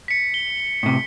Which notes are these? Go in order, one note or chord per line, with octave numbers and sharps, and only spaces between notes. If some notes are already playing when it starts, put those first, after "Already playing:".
B6 C#7
G7
A2 C3